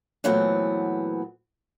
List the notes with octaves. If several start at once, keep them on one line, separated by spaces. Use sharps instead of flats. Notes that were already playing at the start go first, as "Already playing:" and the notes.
A#2 E3 F#3 A3 B3 C4